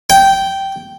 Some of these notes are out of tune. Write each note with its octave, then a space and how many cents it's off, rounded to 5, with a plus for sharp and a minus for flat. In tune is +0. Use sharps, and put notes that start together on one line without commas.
G5 -10